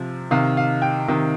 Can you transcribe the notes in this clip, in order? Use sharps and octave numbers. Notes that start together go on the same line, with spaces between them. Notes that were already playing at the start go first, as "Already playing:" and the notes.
Already playing: C3 F3
C3 D#3 F5
F5
G5
C3 D#3